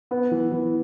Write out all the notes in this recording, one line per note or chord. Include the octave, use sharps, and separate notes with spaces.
B3
E3
E3